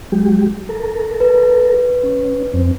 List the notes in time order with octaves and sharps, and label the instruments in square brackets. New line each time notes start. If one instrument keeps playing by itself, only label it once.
[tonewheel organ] F#3 G#3 G4
A4 A#4
[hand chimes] B4
[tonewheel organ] C#4
F2 C4